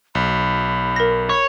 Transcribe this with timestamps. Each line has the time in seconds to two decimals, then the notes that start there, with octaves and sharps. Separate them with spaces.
0.15 B1 B5
0.96 A#4 A#6
1.29 C#5